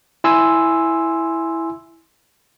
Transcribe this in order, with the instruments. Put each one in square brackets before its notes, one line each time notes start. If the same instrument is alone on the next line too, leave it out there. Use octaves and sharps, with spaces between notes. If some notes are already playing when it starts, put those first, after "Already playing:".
[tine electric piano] E4 G#5 C6 E6